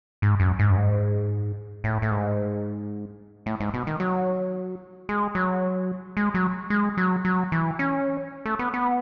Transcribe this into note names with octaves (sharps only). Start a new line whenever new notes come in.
G#2
F#2
G#2
F#2
G#2
A2
A2
G#2
A2
G#2
B2
D#3
F#3
G#3
F#3
G#3
F#3
G#3
F#3
F#3
E3
C#4
A3
B3
B3